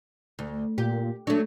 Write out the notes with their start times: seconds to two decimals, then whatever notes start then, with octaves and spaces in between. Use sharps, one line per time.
0.39 D2
0.78 A#2 G4
1.27 F#3 A3 D4